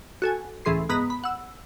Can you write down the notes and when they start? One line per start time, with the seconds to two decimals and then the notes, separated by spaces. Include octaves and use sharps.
0.22 F#4 A4 G#5
0.65 C#2 A2 E3 G#4 C6 C7
0.89 G#2 B3 A#5 D#6 B6
1.10 B5
1.24 F#5 E6